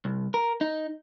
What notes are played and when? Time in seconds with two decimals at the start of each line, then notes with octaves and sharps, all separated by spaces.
0.05 C2
0.34 A#4
0.61 D#4